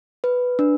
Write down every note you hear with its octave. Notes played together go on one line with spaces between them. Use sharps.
B4
D4